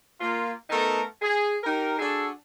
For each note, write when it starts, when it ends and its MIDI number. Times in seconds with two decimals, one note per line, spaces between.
0.21 0.51 58
0.21 0.51 65
0.70 1.01 57
0.70 1.01 59
0.70 1.01 63
0.70 1.01 69
0.70 1.01 70
1.22 1.56 68
1.63 1.94 63
1.63 1.94 67
1.63 1.94 70
1.99 2.29 62
1.99 2.29 66
1.99 2.29 68
1.99 2.29 69